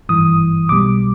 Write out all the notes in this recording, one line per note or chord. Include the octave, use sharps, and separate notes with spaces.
G#1 G2 E3 D#6
B1 B2 G3 D6